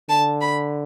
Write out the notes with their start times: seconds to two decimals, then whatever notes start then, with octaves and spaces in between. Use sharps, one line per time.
0.09 D3 A5
0.41 B5